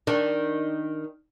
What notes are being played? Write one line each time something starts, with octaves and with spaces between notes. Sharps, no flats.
D#3 D4